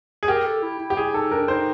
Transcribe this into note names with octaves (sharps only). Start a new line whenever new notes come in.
G#4
G4 A#4
A4
E4
E4
G4
E4 G#4
D#4 A4
D4 A#4
D#4 C5